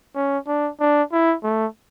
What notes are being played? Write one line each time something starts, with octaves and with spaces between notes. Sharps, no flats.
C#4
D4
D4
E4
A3